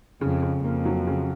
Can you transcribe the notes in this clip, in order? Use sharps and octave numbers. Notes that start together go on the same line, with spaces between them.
F2 C#3
C#3
F2 A#3
F#3
C#3